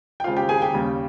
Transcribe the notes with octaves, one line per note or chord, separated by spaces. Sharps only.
G5
C#3 G#3 C4 F4 F5
G4 G5
G#4 G#5
G4 G5
D#2 C#3 G3